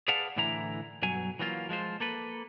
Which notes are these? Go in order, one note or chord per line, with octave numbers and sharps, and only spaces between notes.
G#4 B4 D5 F5 F#5 A5
A2 D3 E3 E4 A#5
B1 G2 F#3 G#5
E3 F#3 A#3 F4
F3 G#3 F4 C5
A#3 A4 B4